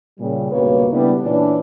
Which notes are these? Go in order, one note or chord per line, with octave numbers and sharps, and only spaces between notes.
A#2 C#3 G3
C#2 G2 B2 A#3 B4 C#5
C#3 G3 A3 B3 D4 E4
A#2 E3 C#4 D4